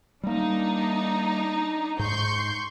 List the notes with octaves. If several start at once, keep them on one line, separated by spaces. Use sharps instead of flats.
G3 A#3 D4 D#4
G#2 C6 C#6 G6